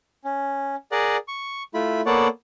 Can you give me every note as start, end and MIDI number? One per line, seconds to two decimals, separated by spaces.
0.24 0.75 61
0.92 1.17 68
0.92 1.17 70
0.92 1.17 74
0.92 1.17 78
1.28 1.63 85
1.74 2.01 57
1.74 2.01 64
1.74 2.01 65
1.74 2.01 83
2.06 2.28 58
2.06 2.28 59
2.06 2.28 69
2.06 2.28 73
2.06 2.28 74
2.06 2.28 78